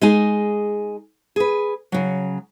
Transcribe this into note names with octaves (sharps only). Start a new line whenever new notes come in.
G#3 D#4 G#4
G#4 B4
C#3 F#3